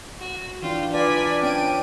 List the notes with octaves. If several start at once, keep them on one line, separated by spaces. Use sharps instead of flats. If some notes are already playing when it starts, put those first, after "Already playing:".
F#4
E3 D4 F4 G5
D4 F4 B4 D5 F5 G#5 B6
C4 C#4 G5 D7 D#7